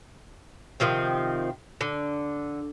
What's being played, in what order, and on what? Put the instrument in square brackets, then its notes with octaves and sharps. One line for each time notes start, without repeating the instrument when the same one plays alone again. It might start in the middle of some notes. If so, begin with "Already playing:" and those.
[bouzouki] C3 D#3 F3 C4
D3